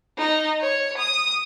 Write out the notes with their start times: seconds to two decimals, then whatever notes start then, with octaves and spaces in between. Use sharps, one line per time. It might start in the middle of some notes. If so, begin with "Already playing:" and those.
0.18 D#4
0.61 C#5
0.97 D#6